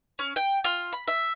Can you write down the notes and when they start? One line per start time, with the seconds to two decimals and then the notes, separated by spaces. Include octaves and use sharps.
0.19 C#4
0.36 G5
0.64 F4
0.93 B5
1.08 E5